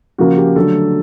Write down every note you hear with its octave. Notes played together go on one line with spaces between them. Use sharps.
C#3 F3 A#3 F#4
G4
D3 F#3 A3 A4